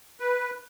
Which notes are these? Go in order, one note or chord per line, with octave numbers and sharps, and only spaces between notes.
B4